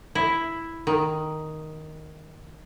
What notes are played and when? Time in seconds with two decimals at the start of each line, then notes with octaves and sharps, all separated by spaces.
0.15 E4
0.87 D#3